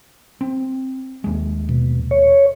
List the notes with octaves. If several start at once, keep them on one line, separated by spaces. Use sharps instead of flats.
C4
D#2 G#3
B2
C#5